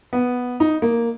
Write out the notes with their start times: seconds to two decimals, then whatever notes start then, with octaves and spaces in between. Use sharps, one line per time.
0.13 B3
0.60 D#4
0.82 A#3